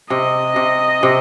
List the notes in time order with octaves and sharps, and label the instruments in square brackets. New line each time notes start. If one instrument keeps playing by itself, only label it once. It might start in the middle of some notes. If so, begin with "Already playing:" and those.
[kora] C3 [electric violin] D#5
[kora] C3
C3